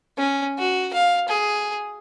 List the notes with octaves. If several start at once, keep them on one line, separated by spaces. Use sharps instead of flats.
C#4
F#4
F5
G#4